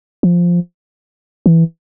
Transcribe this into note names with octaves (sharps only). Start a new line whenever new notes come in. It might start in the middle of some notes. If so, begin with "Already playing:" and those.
F3
E3